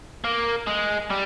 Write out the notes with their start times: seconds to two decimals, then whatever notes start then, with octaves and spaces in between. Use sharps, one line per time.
0.24 A#3
0.67 G#3
1.10 G3